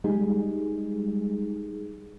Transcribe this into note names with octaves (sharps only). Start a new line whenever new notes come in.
G3 G#3 D#4 G#4